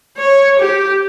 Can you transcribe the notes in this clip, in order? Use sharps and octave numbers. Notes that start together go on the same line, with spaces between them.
C#5
G4